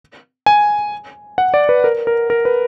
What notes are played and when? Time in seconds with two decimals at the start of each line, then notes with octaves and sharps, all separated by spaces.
0.46 G#5
1.38 F#5
1.54 D5
1.69 B4
1.84 A#4
2.07 A#4
2.30 A#4
2.45 B4